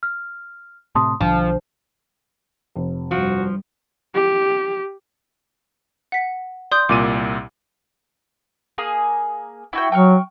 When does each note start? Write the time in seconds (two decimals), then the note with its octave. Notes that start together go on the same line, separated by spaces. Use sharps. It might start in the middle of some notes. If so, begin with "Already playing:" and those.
0.03 F6
0.95 A2 C3 A5 C6 D#6
1.21 B1 D3 F3 D4
2.76 F1
3.11 G2 F3 G3 F#4
4.15 G4
6.12 F#5 B6
6.71 D5 C6 D#6 G6
6.89 C2 A#2 D6 D#7
8.78 A#3 G#4 D#6
9.73 E4 F#4 G5
9.92 F#3 G5 C#6 F6